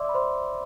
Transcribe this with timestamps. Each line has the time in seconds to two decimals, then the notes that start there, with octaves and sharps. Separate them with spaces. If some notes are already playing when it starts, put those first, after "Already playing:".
Already playing: D5 E5 C6 D6 E6
0.09 B5
0.14 C5 C6